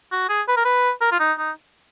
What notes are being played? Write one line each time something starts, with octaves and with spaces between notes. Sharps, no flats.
F#4
G#4
B4
A#4
B4
A#4
F4
D#4
D#4